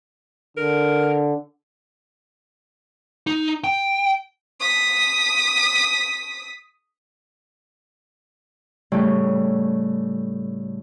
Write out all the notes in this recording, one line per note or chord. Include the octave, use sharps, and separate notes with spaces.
D3 A#4
D#4
G5
D#6 B6
A2 C#3 G3 A3 C#4 G4